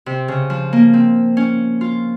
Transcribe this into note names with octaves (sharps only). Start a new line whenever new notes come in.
C3
C#3
F3
A#3
C4
C#4
F4